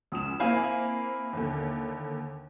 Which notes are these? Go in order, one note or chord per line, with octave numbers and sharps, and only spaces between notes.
C#2 D#6 E7
A#3 C4 E4 F5 G#5
D#2 D3